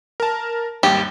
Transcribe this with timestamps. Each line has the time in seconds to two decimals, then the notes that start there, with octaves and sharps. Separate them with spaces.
0.20 A#4 A5
0.83 G#1 D#2 G3 G4